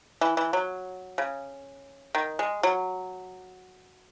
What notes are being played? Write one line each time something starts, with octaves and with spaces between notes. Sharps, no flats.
E3
E3
F#3
C#3
D#3
G#3
F#3